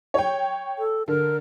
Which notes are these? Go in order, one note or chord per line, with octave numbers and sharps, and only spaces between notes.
C#5 G5
A4
D3 A#4